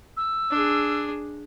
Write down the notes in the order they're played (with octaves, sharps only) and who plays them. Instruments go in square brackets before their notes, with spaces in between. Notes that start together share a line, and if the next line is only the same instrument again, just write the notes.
[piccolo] E6
[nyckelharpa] D4 G#4